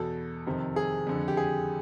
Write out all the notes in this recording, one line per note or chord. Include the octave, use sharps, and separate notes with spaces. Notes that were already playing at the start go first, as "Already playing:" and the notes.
Already playing: E2 B2 A4
F2 C3 D#3
G#4
F2 D3
G4
G#4